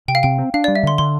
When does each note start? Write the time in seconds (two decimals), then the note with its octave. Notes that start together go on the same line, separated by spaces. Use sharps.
0.08 C3 G5
0.15 F5
0.23 C3 G5
0.39 C4
0.54 D4 F5
0.64 G3 D5
0.76 E5
0.83 D3 C6
0.98 D3 C6